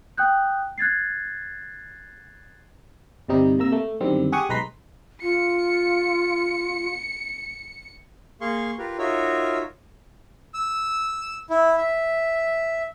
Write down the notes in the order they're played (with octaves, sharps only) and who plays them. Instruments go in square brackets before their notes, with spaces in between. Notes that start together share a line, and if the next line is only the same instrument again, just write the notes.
[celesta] G5 D#6 F#6 G6
F#6 G#6 A6 C7
[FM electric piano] G1 C3 G3 D#4
C3 A#3 A#5 E6
A3
F#2 D3 D#3 G3 C4
G4 G#4 F#5 C#6 D#6
B1 G#3 B4 A#5 C6 B6
[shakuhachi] F4 [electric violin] C#7
[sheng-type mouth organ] A#3 G#4 F5 C6 C#6
F4 G4 A#4 B4
D#4 F4 F#4 A#4 C#5 E5
E6
E4
E5